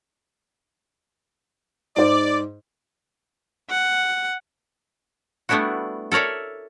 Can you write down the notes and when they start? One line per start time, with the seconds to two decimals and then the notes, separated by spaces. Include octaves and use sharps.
1.97 G#2 C5 D5
3.70 F#5
5.49 G3 A3 B3 D4 E4 F#4
6.12 A4 A#4 C#5 D5 E5